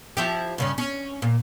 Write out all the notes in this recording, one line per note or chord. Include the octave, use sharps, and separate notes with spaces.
F3 E4 G4
G2 C#3 C#4
C#4
A#2